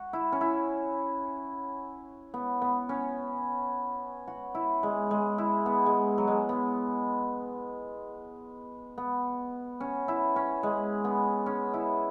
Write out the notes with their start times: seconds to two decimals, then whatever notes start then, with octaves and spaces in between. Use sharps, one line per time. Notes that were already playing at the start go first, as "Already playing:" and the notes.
Already playing: F#4
0.13 E4
0.32 C#4
0.41 E4
2.34 B3
2.62 B3
2.89 C#4
4.28 F#4
4.55 E4
4.83 G#3
5.11 G#3
5.38 E4
5.66 B3
5.86 G#3
6.18 F#3
6.28 G#3
6.49 B3
8.98 B3
9.80 C#4
10.08 E4
10.36 C#4
10.63 G#3
11.05 B3
11.46 C#4
11.74 E4